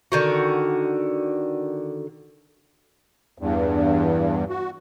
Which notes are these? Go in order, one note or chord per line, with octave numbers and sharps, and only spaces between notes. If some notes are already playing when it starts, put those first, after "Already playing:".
D3 D#3 F#4
E2 G2
F#4